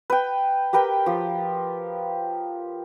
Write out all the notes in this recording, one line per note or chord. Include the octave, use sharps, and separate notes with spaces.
B4 G5
G4 A#4 B4 G5
F3 G4